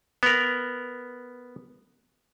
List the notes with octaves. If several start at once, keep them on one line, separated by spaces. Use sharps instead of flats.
B3 A#4